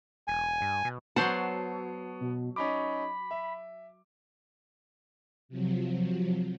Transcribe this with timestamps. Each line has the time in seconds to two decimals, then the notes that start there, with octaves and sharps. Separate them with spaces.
0.28 E1 G#5
0.61 G2
0.85 B2
1.16 F#3 B3 C5 F#5 A5 C#6 C7
2.21 B2
2.56 C#4 D#4 B5 D6
3.31 E5
5.49 C3 F3 F#3